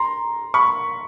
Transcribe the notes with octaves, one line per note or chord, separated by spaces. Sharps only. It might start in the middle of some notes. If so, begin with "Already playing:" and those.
Already playing: A#5 C6
B5 C#6